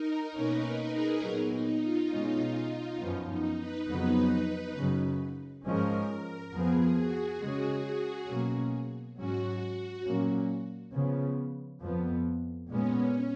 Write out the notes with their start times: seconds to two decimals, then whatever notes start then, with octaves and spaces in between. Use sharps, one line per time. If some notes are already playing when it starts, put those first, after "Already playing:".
Already playing: D#4 A#4
0.35 B2 A#3 C#4 B4
0.64 A#4
0.94 G#4
1.23 A#2 F#3 B3 A#4
1.53 D#4
1.83 F4
2.12 B2 G#3 C#4 D#4
2.56 D#4
2.99 F#2 F3 B3 C#4
3.29 D#4
3.59 B4
3.88 F2 C#3 F#3 B3 B4
4.76 F#2 C#3 F#3
5.64 G#2 F3 G#3 C#4 A#4
6.52 F2 F3 B3 G#4
6.97 F#4
7.40 C#3 G#3 C#4
8.29 B2 F#3 A#3 C#4
9.17 G#2 F#3 C#4 F#4
10.05 A#2 F#3 A#3 C#4
10.94 C#3 F3 B3
11.81 F2 F3 B3
12.69 A#2 G#3 B3 C#4